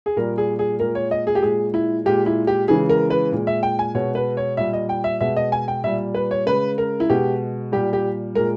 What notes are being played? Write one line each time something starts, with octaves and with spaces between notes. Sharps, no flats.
G#4
A#2 G3 A#4
G#4
G#4
A#2 G#3 A#4
C#5
D#5
G#4
G4
A#2 G#3 G#4
E4
A#2 G#3 G4
E4
G4
C#3 E3 G#3 G#4
A#4
B4
A#2 G#3
E5
G5
G#5
B2 G#3 C#5
B4
C#5
A#2 G3 E5
D#5
G5
E5
B2 G#3 E5
D#5
G#5
G5
A#2 G3 E5
B4
C#5
C#3 G#3 B4
A#4
E4
B2 G#3 G4
A#2 G3 G4
G4
A#2 G#3 A#4